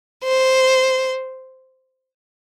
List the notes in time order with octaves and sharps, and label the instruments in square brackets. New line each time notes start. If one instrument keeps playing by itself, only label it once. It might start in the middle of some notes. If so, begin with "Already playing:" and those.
[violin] C5